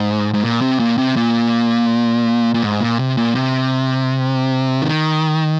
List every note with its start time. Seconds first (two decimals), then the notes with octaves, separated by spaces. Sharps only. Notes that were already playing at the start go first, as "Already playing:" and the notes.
Already playing: G#2
0.34 G#2
0.43 A#2
0.61 C3
0.79 A#2
0.98 C3
1.16 A#2
2.54 A#2
2.63 G#2
2.81 A#2
2.99 C3
3.17 A#2
3.35 C3
4.82 D#3